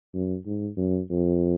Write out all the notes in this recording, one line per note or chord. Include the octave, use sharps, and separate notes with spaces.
F#2
G#2
F#2
F2